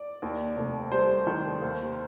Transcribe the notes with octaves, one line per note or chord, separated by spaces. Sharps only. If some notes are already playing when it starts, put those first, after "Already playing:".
Already playing: D5
D#2
F1
G3 C5
D#3
D#2